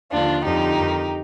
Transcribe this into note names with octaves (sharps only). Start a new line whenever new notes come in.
D#2 D3 F3 D4 F4
F2 D3 F3 D#4 G4
F2 D#3